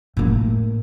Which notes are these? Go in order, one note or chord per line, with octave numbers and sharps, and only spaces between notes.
A2 A#3